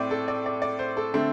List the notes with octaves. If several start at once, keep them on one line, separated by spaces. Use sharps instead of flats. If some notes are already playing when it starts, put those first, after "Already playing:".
Already playing: A2 A3 C4 D5
A4
D5
D5
D5
C5
A4
D3 A3 C4